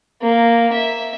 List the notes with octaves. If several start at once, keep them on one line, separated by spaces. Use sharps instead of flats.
A#3
E5